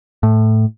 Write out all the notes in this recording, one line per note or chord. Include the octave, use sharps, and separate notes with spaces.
A2